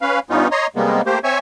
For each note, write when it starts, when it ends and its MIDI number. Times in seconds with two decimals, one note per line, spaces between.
0.02 0.20 61
0.02 0.20 71
0.02 0.20 77
0.30 0.48 43
0.30 0.48 59
0.30 0.48 61
0.30 0.48 63
0.30 0.48 65
0.51 0.67 73
0.51 0.67 75
0.51 0.67 82
0.51 0.67 84
0.76 1.02 48
0.76 1.02 55
0.76 1.02 56
0.76 1.02 58
0.76 1.02 59
1.06 1.19 57
1.06 1.19 58
1.06 1.19 67
1.06 1.19 72
1.24 1.39 60
1.24 1.39 73
1.24 1.39 76
1.24 1.39 80
1.24 1.39 85